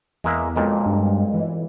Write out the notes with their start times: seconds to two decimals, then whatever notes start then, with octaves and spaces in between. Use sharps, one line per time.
0.24 E2 G#3 A#3 E5
0.56 B1 F2 A#2 G#3
0.86 G2
1.34 E3